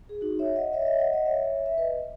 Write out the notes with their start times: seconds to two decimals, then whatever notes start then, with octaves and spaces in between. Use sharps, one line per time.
0.09 G#4
0.21 D#4 F#4
0.39 C#5 E5
0.56 D#5 F#5
0.73 C#5 E5
0.82 D#5
0.86 C#5 E5
0.99 D#5 F#5
1.13 D#5 F#5
1.26 C#5 E5
1.66 E5
1.78 B4 D#5